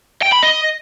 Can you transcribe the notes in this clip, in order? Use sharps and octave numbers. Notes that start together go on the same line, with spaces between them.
G5
B5
D#5